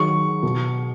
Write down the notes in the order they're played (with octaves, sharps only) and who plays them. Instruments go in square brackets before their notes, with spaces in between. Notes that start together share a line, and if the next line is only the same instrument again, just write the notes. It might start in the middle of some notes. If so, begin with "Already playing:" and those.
Already playing: [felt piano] D#3 F#3 D#4 G#4 [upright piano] C#6
[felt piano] B2